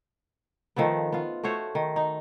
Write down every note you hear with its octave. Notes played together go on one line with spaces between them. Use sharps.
D#3 F3 A3 B3
B3 F4
A3 F#4 C5 C#5
D#3
D#4